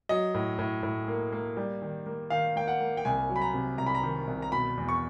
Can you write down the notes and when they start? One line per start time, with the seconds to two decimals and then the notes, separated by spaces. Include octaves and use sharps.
0.09 F#3 D#5
0.34 A2
0.59 A2
0.83 A2
1.08 A#3
1.32 A#3
1.57 G3
1.82 D#3
2.06 A#3
2.30 D#3 F5
2.56 A#3 G5
2.68 F#5
2.80 A#3
2.97 G5
3.05 C2 G#5
3.29 F#3
3.36 B5
3.42 A#5
3.54 C3
3.78 C2 A#5
3.86 B5
3.95 A#5
4.03 D#3
4.27 C2
4.42 A#5
4.52 B2 B5
4.77 E2
4.89 C#6